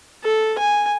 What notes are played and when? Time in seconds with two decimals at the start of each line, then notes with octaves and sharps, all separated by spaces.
0.24 A4
0.59 G#5